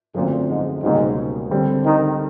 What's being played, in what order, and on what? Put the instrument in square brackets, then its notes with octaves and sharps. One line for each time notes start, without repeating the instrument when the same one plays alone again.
[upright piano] F#2 D3 F3 A3 C4 [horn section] A#2
[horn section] G#2
[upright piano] C#2 B2 G3 A#3 C#4 [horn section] G#2
[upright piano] D3 G3 C4
[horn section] D#3